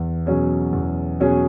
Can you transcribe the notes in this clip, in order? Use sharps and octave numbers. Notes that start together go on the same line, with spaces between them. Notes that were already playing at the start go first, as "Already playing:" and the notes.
Already playing: E2
B2 F#3 C#4 G#4
E2
B2 F#3 C#4 G#4